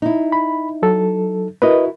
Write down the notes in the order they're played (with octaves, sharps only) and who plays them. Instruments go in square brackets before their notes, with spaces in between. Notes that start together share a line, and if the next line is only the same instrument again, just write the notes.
[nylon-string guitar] D#4 E4
[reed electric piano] B5
F#3 A4
[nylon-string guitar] E4 F#4 A#4 [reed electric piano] B4 D#5